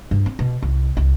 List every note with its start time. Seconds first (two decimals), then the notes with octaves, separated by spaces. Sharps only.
0.11 G2
0.26 C4
0.39 B2
0.62 C2
0.97 C2